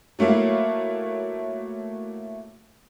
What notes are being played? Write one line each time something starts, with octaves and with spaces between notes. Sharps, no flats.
F#3 A3 A#3 E4 F5